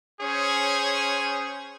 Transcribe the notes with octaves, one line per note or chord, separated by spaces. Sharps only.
C#4 G#4 C5 C#5